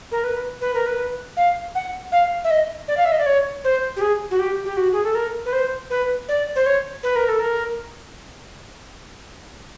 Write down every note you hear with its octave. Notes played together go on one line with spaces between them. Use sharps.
A#4
B4
B4
A#4
B4
F5
F#5
F5
E5
D#5
D5
F5
E5
D#5
D5
C#5
C5
G4
G#4
F#4
G4
G4
F#4
G#4
A4
A#4
B4
C5
B4
D5
C5
C#5
B4
A#4
A4
A#4